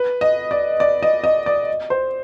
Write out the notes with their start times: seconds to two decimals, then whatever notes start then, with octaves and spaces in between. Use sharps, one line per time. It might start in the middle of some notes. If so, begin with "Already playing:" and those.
Already playing: B4
0.21 D#5
0.51 D5
0.80 D5
1.03 D#5
1.24 D#5
1.46 D5
1.90 C5